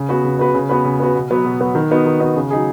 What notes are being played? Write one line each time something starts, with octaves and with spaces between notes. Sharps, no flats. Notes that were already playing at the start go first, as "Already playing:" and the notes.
Already playing: C#3
B3 F#4 B4
C#3
B3 F#4 B4
C#3
B3 F#4 B4
C#3
B3 F#4 B4
B2
F#3 B3 F#4 B4
B2
F#3 B3 F#4 B4
D#3
B3 D#4 F#4
D#3
B3 D#4 F#4
C#3
F#3 D#4 G#4